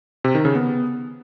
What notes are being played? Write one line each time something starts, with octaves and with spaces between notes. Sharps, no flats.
C3
D#3
C#3
B3